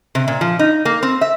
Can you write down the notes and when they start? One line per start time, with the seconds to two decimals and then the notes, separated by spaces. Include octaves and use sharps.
0.15 C3
0.28 A#2
0.41 F3
0.59 D#4
0.85 A#3
1.03 C4
1.21 E5